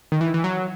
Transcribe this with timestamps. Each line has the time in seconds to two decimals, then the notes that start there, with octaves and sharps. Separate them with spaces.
0.12 D#3
0.21 E3
0.34 E3
0.44 F#3